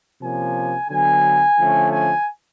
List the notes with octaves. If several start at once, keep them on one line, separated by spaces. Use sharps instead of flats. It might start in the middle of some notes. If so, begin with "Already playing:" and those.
C3 F3 A#3 C#4 G#5
D3 F#3 B3 G#5
D3 F3 A3 C#4
G#5